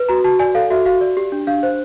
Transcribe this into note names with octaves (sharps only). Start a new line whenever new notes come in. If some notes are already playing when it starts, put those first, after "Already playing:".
Already playing: B4
F#4 A#5
F#4 A5
D5 G#5
A4 F5
F#4 E5
F#4 F5
D5
G4
D4
D4 F5
C5